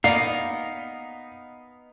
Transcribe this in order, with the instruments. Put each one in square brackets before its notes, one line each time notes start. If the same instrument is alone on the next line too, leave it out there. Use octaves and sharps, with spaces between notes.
[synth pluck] A#3 D5 D6 [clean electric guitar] B3 D#4 A#4 [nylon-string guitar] F5 [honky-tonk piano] C7